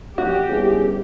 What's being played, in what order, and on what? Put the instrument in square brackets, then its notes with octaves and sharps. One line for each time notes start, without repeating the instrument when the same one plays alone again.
[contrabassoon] A#1 [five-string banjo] F#4 [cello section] G4
[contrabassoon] G1 [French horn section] C#4 E4 G#4